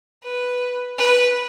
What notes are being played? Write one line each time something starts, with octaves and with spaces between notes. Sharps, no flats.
B4
B4